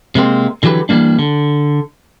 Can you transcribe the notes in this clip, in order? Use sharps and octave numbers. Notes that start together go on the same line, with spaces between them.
C3 G#3 A#3 C4
D3 E3 F#3 G4 B4
E3 G3 A3 A#3 D4
D3